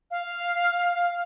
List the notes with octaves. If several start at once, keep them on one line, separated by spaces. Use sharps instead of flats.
F5